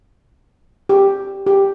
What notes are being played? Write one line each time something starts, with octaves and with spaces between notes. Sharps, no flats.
G4
G4